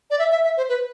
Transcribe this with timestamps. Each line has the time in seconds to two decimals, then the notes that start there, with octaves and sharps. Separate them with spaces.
0.10 D5
0.19 E5
0.32 E5
0.44 E5
0.57 C5
0.69 B4